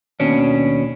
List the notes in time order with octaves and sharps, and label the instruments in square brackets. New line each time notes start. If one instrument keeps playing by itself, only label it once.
[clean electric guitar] D#2 B2 C#4 D4